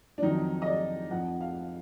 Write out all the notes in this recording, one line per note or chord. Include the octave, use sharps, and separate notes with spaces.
D4
F2 D#3 F#3 D#4
D#5
D5
F2 F3 F#5
F5